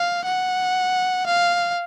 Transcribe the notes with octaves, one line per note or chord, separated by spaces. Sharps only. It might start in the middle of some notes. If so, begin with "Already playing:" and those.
Already playing: F5
F#5
F5